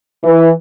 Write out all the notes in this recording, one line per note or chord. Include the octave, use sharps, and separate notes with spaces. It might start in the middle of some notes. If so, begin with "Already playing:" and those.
E3